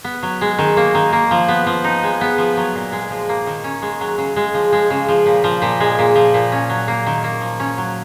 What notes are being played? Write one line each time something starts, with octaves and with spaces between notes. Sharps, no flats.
B3
F#3
G#3
D#3
A#3
D#3
A#3
F3
B3
F3
D#4
G#3
B3
F3
F#3
A#2
G#3
F3
A#3
D#3
C#4
G#3
F#3
C#3
G#3
F3
G#3
C#3
F3
A#2
F3
A#2
G#3
A#2
F3
A#2
C#4
F#3
A#3
D#3
A#3
F3
C#4
F#3